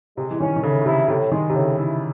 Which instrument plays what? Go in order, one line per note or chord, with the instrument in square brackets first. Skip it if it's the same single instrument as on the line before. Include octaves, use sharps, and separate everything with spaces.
[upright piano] C3 [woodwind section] G#3
[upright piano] E3
[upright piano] D#3 [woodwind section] C#4
[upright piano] D#3
[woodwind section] A2 [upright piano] C#3
[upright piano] C3 [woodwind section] E4
[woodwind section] A2 [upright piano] C3
[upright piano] D#3 [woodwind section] G#3
[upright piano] C3
[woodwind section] A2 [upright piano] C#3
[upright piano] E3 [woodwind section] E4